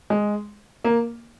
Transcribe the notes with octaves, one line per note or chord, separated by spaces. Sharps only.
G#3
A#3